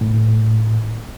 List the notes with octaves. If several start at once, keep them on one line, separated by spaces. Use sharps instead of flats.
A2